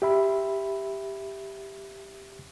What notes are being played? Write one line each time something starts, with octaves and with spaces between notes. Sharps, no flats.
G4 E5 B5